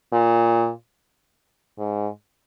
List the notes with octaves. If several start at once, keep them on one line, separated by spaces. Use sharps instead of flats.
A#2
G#2